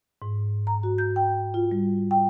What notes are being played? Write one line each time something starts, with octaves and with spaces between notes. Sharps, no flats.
G#2
A#5
F#4
G6
G5
F4
G3
G5